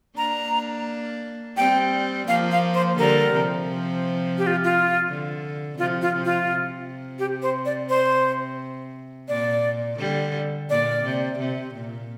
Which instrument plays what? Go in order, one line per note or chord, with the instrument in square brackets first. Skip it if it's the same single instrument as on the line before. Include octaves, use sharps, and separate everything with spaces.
[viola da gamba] A#3 D4 [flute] A#5
[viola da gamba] G3 C4 [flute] G5
[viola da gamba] F3 A#3 [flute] F5
[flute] F5
C5
[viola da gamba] D3 G3 [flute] A#4
[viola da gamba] C3 F3
[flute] G4
F4
F4
[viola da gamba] D3
[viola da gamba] C3 F3 [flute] F4
[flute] F4
[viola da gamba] C3 F3
[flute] F4
[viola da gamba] C3
[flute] G4
C5
D5
C5
[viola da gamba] A#2 [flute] D5
[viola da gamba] D3 G3
[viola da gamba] A#2 [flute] D5
[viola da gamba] C3
C3
A#2